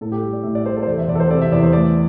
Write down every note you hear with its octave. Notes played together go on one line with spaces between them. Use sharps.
A2 A4
G4
G3
D5
A2 E5
D5
G3 C5
A4
C5
E2 D5
E5
E2 D5
A4
C5
C3 D5
E5
E2 D5
C5
A3 D5